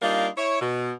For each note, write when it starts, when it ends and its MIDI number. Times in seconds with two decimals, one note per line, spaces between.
0.02 0.28 55
0.02 0.28 58
0.02 0.28 62
0.02 0.28 63
0.02 0.28 65
0.37 0.60 64
0.37 0.60 73
0.61 0.92 47